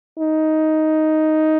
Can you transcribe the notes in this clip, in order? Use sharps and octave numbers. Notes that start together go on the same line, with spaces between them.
D#4